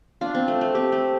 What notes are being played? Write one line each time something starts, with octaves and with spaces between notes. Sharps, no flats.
D4 F4
C4
A3
A3
C4 G4
A3